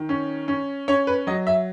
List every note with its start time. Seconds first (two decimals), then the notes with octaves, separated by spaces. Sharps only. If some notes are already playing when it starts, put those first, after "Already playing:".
Already playing: D#3
0.09 C#4
0.48 C#4
0.88 C#4 C#5
1.07 B4
1.27 F#3 D#5
1.47 E5